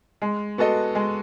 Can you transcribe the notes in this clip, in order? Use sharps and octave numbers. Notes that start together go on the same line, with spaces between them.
G#3
B3 F#4 A4 D#5
G#3